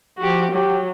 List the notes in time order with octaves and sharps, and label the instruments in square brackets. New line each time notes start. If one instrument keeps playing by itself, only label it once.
[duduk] F3 [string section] F#4 G4
[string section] F#3 [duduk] G4